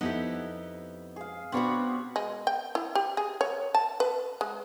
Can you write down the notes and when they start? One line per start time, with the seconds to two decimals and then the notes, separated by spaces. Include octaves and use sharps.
0.01 F2 B3 D#4 E4 G4
1.16 G#4 F5
1.52 B2 B3 C4 D4 F#4 C#5 D5 B5
2.16 G#3
2.47 G5
2.75 E4
2.95 G4
3.17 G#4
3.41 C#5
3.75 A5
4.00 B4
4.41 G#3